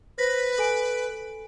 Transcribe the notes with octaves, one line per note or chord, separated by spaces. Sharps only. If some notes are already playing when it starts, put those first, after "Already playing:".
B4 C5 A#6 B6
A4 G#5 D7